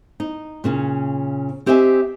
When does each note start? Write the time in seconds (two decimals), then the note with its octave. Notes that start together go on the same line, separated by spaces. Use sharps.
0.20 D#4
0.64 A#2 C#3 C#4
1.66 C4 G4 D#5 E5 G5 G#5